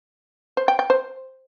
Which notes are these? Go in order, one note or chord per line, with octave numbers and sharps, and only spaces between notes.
C5
G5
G5
C5